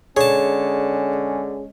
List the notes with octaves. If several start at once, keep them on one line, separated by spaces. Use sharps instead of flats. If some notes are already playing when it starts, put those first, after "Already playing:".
D3 G#3 C#4 G#4 C#5 A5